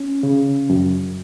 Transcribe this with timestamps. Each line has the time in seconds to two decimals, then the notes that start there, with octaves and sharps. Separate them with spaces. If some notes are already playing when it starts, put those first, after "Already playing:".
Already playing: C#4
0.23 C#3
0.70 F#2